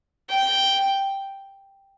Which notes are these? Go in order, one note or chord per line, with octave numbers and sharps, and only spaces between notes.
G5